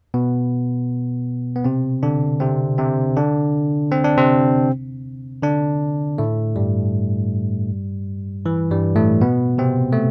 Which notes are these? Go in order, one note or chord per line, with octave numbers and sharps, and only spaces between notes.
B2 B3
B3
C3 C4
D3 D4
C3 C4
C3 C4
D3 D4
C4
D4
C3 C4
D3 D4
A2 A3
G2 G3
E3
G2 G3
A2 A3
B2 B3
C3 C4
A3